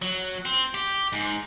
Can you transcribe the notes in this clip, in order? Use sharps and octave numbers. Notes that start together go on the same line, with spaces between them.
F#3
C4
G4
G#2